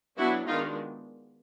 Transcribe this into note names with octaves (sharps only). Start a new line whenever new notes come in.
F#3 B3 D4 E4 F#4
D#3 G#3 B3 D4 D#4 F4